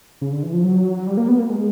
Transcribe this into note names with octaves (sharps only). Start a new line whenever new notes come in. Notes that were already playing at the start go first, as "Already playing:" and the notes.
C#3
D3
E3
F3
F#3
G3
A#3
B3
A#3
G#3